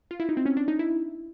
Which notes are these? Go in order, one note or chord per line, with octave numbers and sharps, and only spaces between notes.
F4
E4
D#4
C4
C#4
D4
D#4
E4